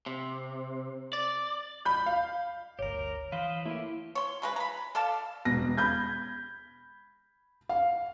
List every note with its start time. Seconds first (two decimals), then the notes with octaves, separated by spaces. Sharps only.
0.06 C3
1.13 D5
1.85 B5 G6
2.06 F5
2.79 G1 D2 G4 A#4 C#5
3.32 E3 B4 C5 D#5 F5
3.66 A3 A#3 E4 G4
4.15 C#5 C6
4.42 C#3 G#3 B4
4.56 A#5 B5
4.95 A4 D5 F5 A5
5.45 E1 B2 B3 A#6
5.77 B5 G6 G#6
7.69 F5